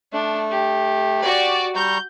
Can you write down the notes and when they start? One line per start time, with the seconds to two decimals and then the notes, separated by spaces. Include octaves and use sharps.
0.13 A3 D4
0.51 G4
1.22 F#4 D5
1.76 G3 A#5 C#6 G6